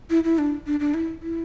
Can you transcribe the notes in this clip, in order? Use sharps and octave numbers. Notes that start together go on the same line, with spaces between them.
E4
E4
D4
D4
D4
E4
E4